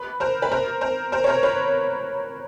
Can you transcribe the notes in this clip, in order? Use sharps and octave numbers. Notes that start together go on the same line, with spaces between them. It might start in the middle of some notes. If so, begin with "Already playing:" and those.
Already playing: B4
A#4 C5
B4
A#4 C5
A#4 C5
A#4 C5
C#5
A#4 C5
B4 C#5